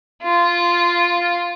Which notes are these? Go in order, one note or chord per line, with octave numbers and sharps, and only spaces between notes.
F4